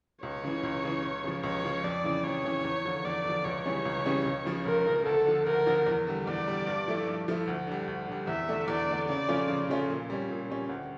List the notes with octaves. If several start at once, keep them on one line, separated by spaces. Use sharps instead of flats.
C#2 C#5
C#3 E3
C#2
C#3 E3
C#2
C#3 F3
C#2 C#5
C#3 F3
F2 D5
C#3 E3
F2 C#5
C#3 E3
E2
D3 F3
E2 D5
D3 F3
C#2 C#5
C#3 E3 G3 C#4
C#2
C#3 E3 G3 C#4
C#2
C#3 F3
C#2 A#4
C#3 F3
D2 A4
D3 F3
D2 A#4
D3 F3
E2
D3 G3
E2 D5
D3 G3
G2
F3 A3 E4
G2
F3 A3 E4
D2
D3 G3
D2
D3 G3
E2 E5
D3 A3 D4
E2 D5
D3 A3 D4
C#3 D5
F3 A3 C#4 F4
C#3
F3 A3 C#4 F4
A#2
G3 C#4
A#2
G3 C#4
D2